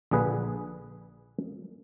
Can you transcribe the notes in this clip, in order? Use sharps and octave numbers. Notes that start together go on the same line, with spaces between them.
A#1 D3 G#4 B4